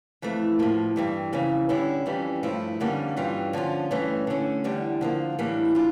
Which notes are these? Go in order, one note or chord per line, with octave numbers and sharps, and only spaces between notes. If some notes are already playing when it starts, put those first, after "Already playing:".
F2 E3 A3
A2 F3 A#3
G2 E3 G3
F2 C#3 E3
D3 G3 C#4 E4
F2 E3 G3 C#4
G2 F3 A3 E4
F2 D3 G3 A#3 C#4
G2 E3 G3 C#4 F4
D3 F3 C#4 F4
G2 E3 A3 C#4
D3 A3 C#4
E2 D3 G3
D3 F3 A#3
A2 E3 G3 A#3 D4
D4 F4